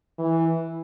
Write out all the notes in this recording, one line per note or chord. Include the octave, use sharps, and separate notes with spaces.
E3